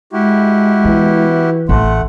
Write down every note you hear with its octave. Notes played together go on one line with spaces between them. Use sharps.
G#3 E4 F#4 G4
E3 B3
A1 A3 F#5 C6